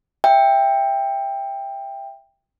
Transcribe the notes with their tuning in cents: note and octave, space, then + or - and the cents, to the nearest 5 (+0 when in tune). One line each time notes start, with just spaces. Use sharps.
E5 +0 G5 +15